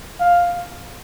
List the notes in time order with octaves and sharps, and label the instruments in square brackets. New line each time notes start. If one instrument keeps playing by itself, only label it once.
[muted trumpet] F5